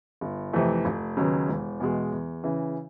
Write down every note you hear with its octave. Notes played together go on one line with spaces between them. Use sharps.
G1
F2 C3 E3 A3
F1
D#2 C#3 F#3 B3
E1
E2 B2 G#3
E2
C#3 E3